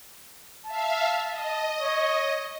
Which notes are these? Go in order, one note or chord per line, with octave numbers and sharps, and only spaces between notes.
E5 F5 A5
D#5
C#5